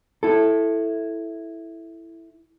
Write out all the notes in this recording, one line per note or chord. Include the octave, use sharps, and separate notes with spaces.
E4 A4